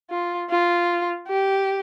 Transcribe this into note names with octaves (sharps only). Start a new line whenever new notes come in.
F4
F4
G4